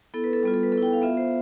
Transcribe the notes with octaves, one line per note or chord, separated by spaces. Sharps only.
B3 E4 A4
B4
A4
G3 B3 F4
A4
B4
B3 A4
E4
G5
F5
B3 F4 E5
C5